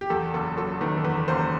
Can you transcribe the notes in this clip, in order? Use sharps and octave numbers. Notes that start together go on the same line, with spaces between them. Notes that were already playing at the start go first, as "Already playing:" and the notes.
G4
E2 A4
F#1 A4
F#3 A4
D#3 B4
A4
E2 B4
F#1 C5